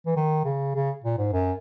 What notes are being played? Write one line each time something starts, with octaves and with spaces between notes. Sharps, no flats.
E3
D#3
C#3
C#3
A#2
G#2
F#2